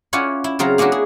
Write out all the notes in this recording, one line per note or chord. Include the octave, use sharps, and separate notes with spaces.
C#4 E4 F4 C#5 D5 F#5
E4
C#3 F#3 C4 F4 A#5
A#3 C#4 D4 E4 F#4
G#4